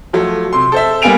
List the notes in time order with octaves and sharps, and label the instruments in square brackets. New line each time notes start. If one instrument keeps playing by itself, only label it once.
[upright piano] F3 F#3 A3
C3 C6
A4 C5 E5
G3 A#3 B3 G#5 D7 F7